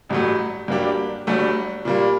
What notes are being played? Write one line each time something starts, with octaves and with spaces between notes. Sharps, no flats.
A1 G2 F#3 A3
G2 F#3 A#3 D4 G4
G1 G2 F#3 A3 D4
A#2 G3 A#3